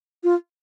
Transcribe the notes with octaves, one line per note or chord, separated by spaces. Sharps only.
F4